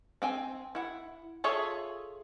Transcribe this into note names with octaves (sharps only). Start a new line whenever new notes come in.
C4 G5 G#5
E4 F#5
F4 G#4 A4 C#5 E5